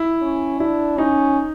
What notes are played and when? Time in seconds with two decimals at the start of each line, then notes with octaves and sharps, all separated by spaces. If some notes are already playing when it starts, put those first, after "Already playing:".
Already playing: E4
0.22 C#4
0.60 D4 E4
0.98 C#4 D#4